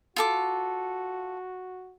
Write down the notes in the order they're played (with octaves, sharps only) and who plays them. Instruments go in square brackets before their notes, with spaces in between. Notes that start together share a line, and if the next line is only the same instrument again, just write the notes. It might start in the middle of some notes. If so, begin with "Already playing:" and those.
[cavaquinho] F4 A4 D6 [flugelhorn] F#4